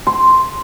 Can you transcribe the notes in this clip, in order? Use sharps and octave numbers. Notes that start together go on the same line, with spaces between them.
C6